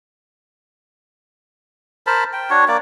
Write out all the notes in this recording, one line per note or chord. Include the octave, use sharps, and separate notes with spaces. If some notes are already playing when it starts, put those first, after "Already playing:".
A#4 C5 A5 B5
G5
D4 F#4 C#5
A#3 D5